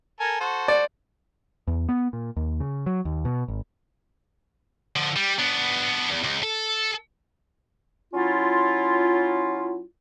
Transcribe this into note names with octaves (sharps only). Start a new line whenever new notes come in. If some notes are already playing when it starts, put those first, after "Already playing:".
A4 A#4 G#5
F#4 A4 C5
D5
E2
B3
A#2
D#2
C#3
F#3
D#2
B2
G#1
D3 F3
G3
B3 D4
E2
C#2
A4
F#3 C#4 E4 F4